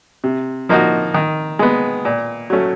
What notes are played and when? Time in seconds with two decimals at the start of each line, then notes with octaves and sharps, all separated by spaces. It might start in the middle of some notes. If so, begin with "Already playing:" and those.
0.24 C3
0.69 F3 A#3 D#4 F#4
1.14 D#3
1.59 G#3 B3
2.05 A#2
2.50 F#3 A3 C#4